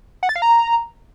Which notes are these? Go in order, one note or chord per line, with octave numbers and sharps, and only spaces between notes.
F#5
A6
F5
A#5